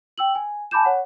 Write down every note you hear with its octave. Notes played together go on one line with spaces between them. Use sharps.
G5 E6 F#7
G#5
G#5 A5 B5 D6 G6 E7
C#5 F#5